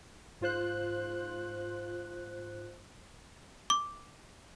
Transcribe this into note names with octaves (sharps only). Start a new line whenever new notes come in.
G#2 F4 C5 F#6
D6